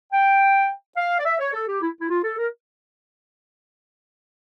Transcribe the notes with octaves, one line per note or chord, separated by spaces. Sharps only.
G5
F5
D5
E5
C#5
A4
G4
E4
E4
F4
A4
A#4